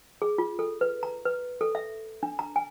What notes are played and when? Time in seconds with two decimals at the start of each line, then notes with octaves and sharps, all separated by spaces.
0.22 G#4
0.38 F4
0.59 A4
0.81 B4
1.03 A#5
1.25 B4
1.61 A4
1.75 E5
2.23 D4
2.39 A#5
2.56 G#5